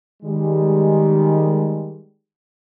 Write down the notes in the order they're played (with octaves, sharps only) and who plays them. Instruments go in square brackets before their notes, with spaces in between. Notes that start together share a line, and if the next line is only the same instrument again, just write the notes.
[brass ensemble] D#3 G3 G#3